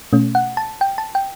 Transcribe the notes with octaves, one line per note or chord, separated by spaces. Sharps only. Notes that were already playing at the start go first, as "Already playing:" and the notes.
B2 A3 C#4
F#5
A5
G5
A5
G5